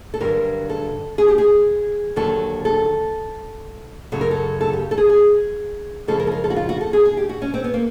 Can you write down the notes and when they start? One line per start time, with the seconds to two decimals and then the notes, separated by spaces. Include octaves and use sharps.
0.14 A4
0.20 G2 D3 F#3 A#4
0.69 A4
1.18 G#4
1.28 G4
1.38 G#4
2.16 D#2 D3 F#3 A4
2.65 A4
4.12 F#2 C#3 F#3 A4
4.21 A#4
4.31 A4
4.61 A4
4.73 G4
4.91 A4
4.98 G#4
5.09 G#4
6.07 F#2 C#3 F3 G#3 A4
6.20 A#4
6.27 A4
6.32 A#4
6.44 A4
6.50 F#4
6.56 F4
6.69 F#4
6.81 A4
6.93 G#4
7.05 G#4
7.17 G4
7.29 F#4
7.42 C#4
7.54 C4
7.64 B3
7.74 A#3